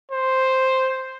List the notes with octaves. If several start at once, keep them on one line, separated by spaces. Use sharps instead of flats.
C5